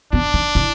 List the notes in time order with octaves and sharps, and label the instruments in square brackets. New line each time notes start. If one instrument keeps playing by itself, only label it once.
[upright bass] B3 [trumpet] D4
[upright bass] D#4
E4